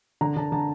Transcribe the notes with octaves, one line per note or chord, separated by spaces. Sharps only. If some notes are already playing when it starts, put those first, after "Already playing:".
D3 A#5
D3 A5
D3 A5